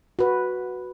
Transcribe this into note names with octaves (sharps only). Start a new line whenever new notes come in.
F#4 B4